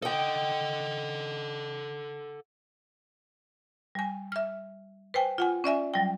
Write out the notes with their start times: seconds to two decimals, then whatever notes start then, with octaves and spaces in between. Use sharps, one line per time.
0.02 A4 D#5 F#5 G5
3.95 G3 G#5
4.32 E5 F6
5.14 B4 C5 G5 G#5
5.38 F4 F#5 G#5
5.64 C#4 D5 E5 G#5
5.94 F#3 G3 G5